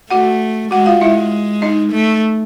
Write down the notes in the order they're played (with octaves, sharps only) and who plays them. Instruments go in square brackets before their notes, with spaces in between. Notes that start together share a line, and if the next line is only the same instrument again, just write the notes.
[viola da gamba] A3 [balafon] F#4 F#5
[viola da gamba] G#3 [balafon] F#4 F#5
[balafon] F4 F5
[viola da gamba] G#3 [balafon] E4 E5
[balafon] D#4 D#5
[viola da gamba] A3